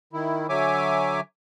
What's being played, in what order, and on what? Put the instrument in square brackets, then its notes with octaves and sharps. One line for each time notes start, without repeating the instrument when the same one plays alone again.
[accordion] D#3 E4
D3 F#3 C#5 E5 G#5 D6